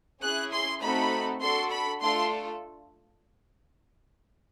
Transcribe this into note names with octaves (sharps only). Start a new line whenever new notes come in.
C#4 E4 G#4 F#6
C6
A3 C4 D#4 F#4 A4 B5
D4 F#4 A4 C6
B5
A3 D4 F4 A4 C6